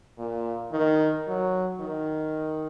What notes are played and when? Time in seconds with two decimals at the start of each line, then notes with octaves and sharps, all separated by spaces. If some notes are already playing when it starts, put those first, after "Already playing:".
0.18 A#2
0.72 D#3
1.27 F#3
1.80 D#3